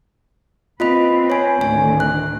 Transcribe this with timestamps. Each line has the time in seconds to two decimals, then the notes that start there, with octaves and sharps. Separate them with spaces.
0.80 C4 F4 B4 D#5 B5
1.30 C#5 G#5
1.61 D2 A2 D#3 G#5
2.00 F#6